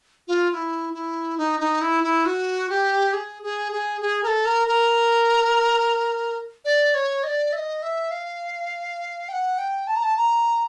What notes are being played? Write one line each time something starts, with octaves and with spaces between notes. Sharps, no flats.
F4
F4
E4
E4
D#4
D#4
E4
E4
F#4
G4
G#4
G#4
G#4
G#4
A#4
A4
A#4
A#4
D5
C#5
D#5
D5
E5
D#5
E5
F5
G5
F#5
G5
A5
A#5
A5
A#5